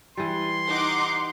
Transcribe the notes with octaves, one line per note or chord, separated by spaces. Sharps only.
E3 G3 C6
D#4 F#5 D6